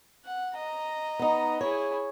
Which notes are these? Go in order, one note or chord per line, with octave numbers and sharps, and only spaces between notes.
F#5
D#5 A#5
B3 D#4
E4 G#4 C#5